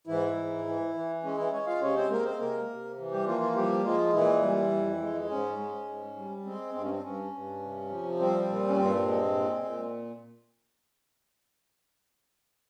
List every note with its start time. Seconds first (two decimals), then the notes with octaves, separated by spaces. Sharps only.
0.07 G#2 E3 E4
0.37 G#2
0.65 E3
0.94 E3
1.23 G#3 C#4
1.37 E3 E4
1.52 G#3 C#4 C#5
1.67 F4 F5
1.81 C3 C#4 C#5
1.96 C4 C5
2.10 G#3 A#3 A#4
2.25 C4 C5
2.39 C3 A#3 A#4
2.68 C3
2.98 E3
3.11 G3 G4
3.26 F3 A#3 F4
3.41 F3 F4
3.55 F3 G3 G4
3.84 F3 G#3 F4
4.13 A#2 E3 E4
4.42 G3
4.71 F2
5.00 G#3
5.29 G#2 C#4
5.58 G#3
5.88 G#2
6.16 G3
6.45 G#3 C4
6.74 G2 C4
6.82 C#4
6.91 C4
7.03 G2 C#4
7.33 G2
7.62 C3
7.90 F3
8.19 G3 C4
8.48 A#2
8.68 C#4
8.77 G2 C4
9.06 G#3
9.35 A#2
9.64 A#2